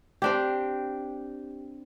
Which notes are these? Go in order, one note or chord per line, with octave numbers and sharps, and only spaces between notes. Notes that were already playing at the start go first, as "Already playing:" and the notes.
C4 D4 G4